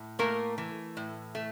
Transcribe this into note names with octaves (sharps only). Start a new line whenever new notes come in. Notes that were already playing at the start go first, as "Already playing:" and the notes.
Already playing: A2
A3 A#3 A#4
E3
A2
A3